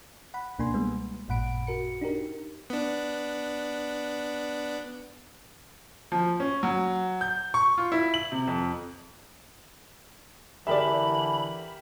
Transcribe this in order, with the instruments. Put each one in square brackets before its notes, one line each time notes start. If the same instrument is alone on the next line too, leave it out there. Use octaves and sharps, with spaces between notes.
[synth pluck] F#5 B5
C#2 B2 A#3 D4 G#5 C6
G3 G#3 B3
A1 F#2 A#2 F#5 B5 D7
F#4 A#4 C#7
D4 D#4 G4 A#4
[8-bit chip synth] B3 D4
[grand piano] F3
C#4
F#3
G6
C#6
F4
E4
F#7
C3
F2
[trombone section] D3 E3 [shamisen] G#3 D5 [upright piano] G4 A#4 E5 [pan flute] B5